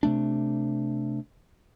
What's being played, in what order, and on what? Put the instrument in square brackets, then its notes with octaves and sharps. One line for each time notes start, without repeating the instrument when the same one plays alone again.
[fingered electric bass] C3 A3 D4